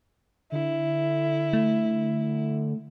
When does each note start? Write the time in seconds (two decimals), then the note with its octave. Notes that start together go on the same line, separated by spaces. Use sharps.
0.52 D3 E4
1.53 A3